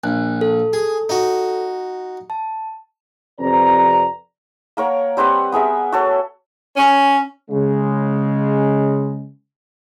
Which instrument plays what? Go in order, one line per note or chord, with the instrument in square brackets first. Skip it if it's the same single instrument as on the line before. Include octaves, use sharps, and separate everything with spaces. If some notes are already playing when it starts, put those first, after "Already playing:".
[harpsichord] A#1 [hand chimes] F#6
[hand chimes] A4
[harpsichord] G#4
D#4 F#4
[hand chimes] A5
[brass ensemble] F2 C3 B4 D5 A#5
[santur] A#3 A#4 C#5 F#5
G3 C4 B4 F#5
B3 G#4 A#4 E5
F#4 A4 C#5
[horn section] C#4
[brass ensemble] C#3 G#3